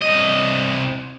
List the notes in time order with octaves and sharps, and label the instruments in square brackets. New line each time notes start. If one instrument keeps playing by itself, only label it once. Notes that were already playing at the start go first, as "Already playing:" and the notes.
[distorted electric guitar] C2 D#5